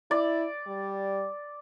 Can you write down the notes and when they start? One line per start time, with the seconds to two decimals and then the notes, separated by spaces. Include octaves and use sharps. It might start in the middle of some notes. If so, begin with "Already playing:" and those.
0.11 E4 D5
0.66 G3